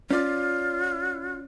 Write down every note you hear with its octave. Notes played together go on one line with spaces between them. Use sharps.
C#4 F4 D5